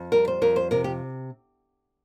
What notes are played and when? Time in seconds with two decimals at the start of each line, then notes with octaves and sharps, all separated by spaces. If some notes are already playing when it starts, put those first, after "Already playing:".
Already playing: F2
0.12 G3 A#4
0.28 C5
0.42 F2 A#4
0.56 C5
0.71 C3 A#4
0.84 G4